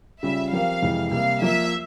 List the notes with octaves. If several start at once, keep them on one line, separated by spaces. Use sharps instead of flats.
C#3 G3 C#4 F4 E5
F3 C4 G4 A#4 F5
F2 C3 E3 G#3
C3 G3 A#3 F5
F3 A#3 F4 A#4 E5